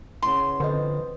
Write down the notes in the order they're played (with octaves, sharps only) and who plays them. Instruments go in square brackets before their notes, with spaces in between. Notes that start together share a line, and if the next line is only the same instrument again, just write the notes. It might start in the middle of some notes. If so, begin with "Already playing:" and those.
[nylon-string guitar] C#3 B3 E4 [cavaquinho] C6
[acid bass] D3 [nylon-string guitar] F3 C4 [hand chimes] B4 D#5